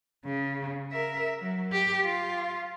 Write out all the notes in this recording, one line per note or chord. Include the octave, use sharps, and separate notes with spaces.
C#3
A#4 E5
F#3
G4
F4